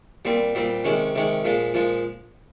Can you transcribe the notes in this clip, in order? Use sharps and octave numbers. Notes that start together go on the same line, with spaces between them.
A#2 G3 C4
A#2 G3 C4
C3 D#3 G#3 C#4
C3 D#3 G#3 C#4
A#2 F3 G#3
A#2 F3 G#3